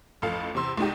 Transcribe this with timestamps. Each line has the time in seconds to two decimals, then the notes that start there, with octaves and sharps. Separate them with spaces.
0.22 A1 F2 A4 F5
0.55 E2 C3 C6 E6
0.77 C2 G#3 D#4 G4